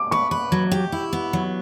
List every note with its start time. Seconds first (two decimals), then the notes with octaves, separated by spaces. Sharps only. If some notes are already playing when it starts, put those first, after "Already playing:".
Already playing: D6
0.11 B4 C#6
0.31 B4
0.52 F#3
0.72 G4
0.92 E4
1.13 B3
1.33 F#3